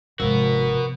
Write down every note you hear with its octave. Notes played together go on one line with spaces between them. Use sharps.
G#1 C3 F3 B3 F#4 A#4